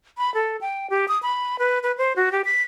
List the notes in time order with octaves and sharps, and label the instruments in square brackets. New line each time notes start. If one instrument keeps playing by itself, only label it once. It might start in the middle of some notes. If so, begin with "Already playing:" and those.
[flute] B5
A4
G5
G4
D#6
B5
B4
B4
C5
F#4
G4
B6